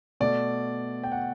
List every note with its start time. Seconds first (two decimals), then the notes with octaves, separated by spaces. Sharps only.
0.20 B2 A3 D5
1.04 G5
1.12 F#5